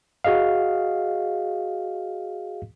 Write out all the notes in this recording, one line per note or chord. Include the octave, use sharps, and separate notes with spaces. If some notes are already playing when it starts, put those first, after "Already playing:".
F#4 G#4 D#5 F5